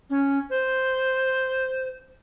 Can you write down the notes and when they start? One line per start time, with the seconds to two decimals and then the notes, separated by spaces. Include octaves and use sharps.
0.10 C#4
0.50 C5